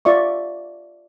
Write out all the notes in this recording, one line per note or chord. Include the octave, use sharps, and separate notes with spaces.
F4 D5 E5 C#6